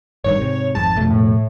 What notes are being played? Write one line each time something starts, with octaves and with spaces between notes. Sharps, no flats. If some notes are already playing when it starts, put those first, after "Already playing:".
G#1 G2 D#3 C#5
G#2 C3
G#1 F2 G#2 A5
F2 B2 A3
A2